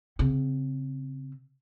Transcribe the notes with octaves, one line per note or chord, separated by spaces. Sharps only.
C#3 C4